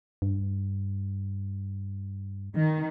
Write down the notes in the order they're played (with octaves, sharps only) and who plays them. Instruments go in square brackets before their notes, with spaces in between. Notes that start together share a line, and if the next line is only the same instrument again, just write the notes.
[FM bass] G2
[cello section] D#3